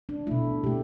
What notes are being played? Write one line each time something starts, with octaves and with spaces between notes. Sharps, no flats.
D4
B2 A3 E4
B2 A3 G4